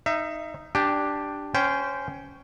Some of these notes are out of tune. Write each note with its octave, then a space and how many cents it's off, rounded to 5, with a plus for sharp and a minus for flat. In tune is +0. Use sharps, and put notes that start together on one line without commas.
D#4 +0 E5 +25
D4 +0 G4 +0 G#5 -40
C#4 +5 C5 -20 G5 -5